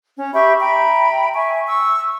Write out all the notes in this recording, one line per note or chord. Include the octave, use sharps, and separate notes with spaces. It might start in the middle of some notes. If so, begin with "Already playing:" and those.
C#4
G4 E5 B5 C#6
E5 G5 A#5 B5
E5 G#5 C#6
C#6 E6